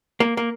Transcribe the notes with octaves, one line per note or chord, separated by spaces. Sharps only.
A#3
A#3